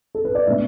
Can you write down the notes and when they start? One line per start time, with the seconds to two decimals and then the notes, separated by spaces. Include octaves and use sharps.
0.15 A4
0.25 B4
0.35 D5
0.46 B2 A3 D4 E5